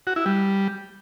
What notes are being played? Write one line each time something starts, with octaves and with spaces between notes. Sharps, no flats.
F#4
E4
G3